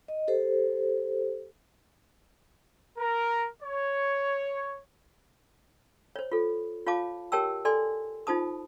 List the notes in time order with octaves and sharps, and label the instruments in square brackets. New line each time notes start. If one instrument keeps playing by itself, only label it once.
[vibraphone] D#5
G4 A4 C5
[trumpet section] A#4
C#5
[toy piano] C5 C#5
F4 A4
F4 C#5 F5 A5 D6
G4 A#4 C#5 G5 A5 E6
A4 D5 G#5 C6
D#4 F4 C5 A5 D#6